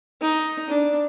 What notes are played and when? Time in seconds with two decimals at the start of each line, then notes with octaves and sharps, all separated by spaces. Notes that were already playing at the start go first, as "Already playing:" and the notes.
0.21 D#4
0.70 D4